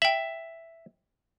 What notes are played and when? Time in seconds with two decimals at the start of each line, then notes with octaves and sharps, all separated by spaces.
0.02 E5 G5 F#7